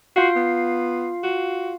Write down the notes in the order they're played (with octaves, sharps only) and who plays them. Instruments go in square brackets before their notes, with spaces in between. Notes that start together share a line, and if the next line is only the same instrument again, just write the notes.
[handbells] F4 F5 C7 [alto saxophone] F#4
[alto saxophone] B3
F#4